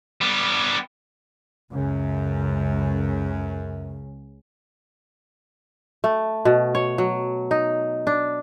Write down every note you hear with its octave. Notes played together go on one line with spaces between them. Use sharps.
G3 B3
C#2 F#2 C#3
A3
B2
C#5
F#3
D#4
D4